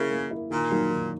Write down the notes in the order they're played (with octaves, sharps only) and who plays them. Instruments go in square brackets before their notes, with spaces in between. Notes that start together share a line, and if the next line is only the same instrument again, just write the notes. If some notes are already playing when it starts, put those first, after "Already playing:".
Already playing: [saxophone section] C#3 [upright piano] A#3 E4 A#4
[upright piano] A#3
E4 A#4
[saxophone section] A#2 [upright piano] D#3
[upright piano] F#3 A#3 D#4
D#3